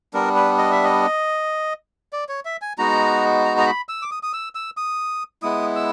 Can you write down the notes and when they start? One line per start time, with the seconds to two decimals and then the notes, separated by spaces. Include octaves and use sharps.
0.14 G3 B3 D4 A#4
0.35 B4
0.58 D#5
0.71 E5
0.84 D#5
2.13 D5
2.29 C#5
2.45 E5
2.62 G#5
2.78 G#3 B3 D#4 F#4 A#5
3.45 A#5
3.58 A#5
3.66 B5
3.89 E6
4.02 D6
4.11 D#6
4.23 D#6
4.33 E6
4.55 E6
4.77 D#6
5.42 G#3 B3 E4 D#6
5.76 E6